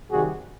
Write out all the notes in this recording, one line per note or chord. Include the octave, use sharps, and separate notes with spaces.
C3 D#3 G3 F#4 G#4